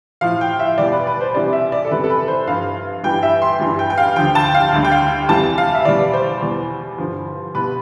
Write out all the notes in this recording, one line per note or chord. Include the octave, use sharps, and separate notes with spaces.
A2 F3 F5
G5
E5
E2 B2 G3 D5
B4
B4
C5
C2 C3 E3 G3 D5
E5
D5
A4
E2 C3 E3 G3 B4
A4
B4
C5
G2 F3 F5
G2 E3 G3 G5
E5
C6
G2 E3 G3
G5
G5
F5
D2 D3 F3 G5
A5
G5
F5
D2 D3 G3
G5
F5
E2 C3 G3 A5
F5
E5
E2 B2 G3 D5
C5
E2 B2 G3
G2 D3 F3
C2 B2 G3 B4